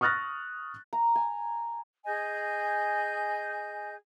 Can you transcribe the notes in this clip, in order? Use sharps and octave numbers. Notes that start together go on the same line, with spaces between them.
C#6 D#6 F6 F#6 A6 A#6
A#5
G#5
G#4 D#5 G#5 G6